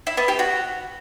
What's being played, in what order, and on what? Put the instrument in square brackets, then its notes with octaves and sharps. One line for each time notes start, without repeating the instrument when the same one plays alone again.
[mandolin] E4
B3
G4
F#4